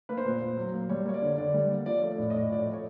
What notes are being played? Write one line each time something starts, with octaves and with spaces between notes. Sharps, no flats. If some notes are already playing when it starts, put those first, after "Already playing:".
A#3 B4
C5
A#2
A#2
F#3
A#3
G3 C#5
A#3 C#5
D5
D3
D3 D5
G3
A#3
F3 D5
A3 C#5
D5
A2
D#5
A2 D5
F3 D5
C#5
A3
C#5